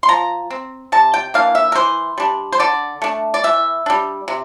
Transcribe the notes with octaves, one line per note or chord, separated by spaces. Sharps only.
C6
F3 A#5
C4
C3 A5
G5
E3 A#3 D4 F5
E5
A#4
E3 C5
G3 D4
C5
D3 D5
A3 D4
D5
E3 E5
G3 D4
C3